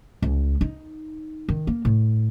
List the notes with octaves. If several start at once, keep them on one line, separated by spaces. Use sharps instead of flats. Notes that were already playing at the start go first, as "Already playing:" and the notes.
C#2
D#4
D#3
A#3
A2